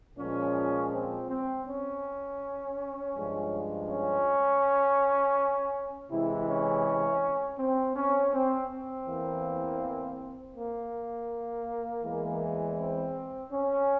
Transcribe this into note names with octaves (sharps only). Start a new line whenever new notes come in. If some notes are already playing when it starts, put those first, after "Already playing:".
A#2 F3 G#3 C#4
C4
C4
C#4
G2 F3 G#3
C#4
C3 E3 G#3 E4
C#4
C4
C#4
C4
C4
E2 E3 A#3
A#3
E2 E3 G#3
C4
C#4